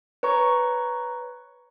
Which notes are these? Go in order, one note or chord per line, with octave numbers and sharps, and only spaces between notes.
B4 C#5 A#5 C#6